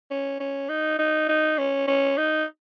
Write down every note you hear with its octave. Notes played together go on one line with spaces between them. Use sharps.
C#4
C#4
D#4
D#4
D#4
C#4
C#4
D#4